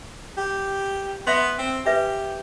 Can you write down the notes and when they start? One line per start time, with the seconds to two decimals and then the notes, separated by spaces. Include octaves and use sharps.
0.37 G4
1.27 B3 E5 C6
1.58 C4
1.86 G4 B4 E5 G#5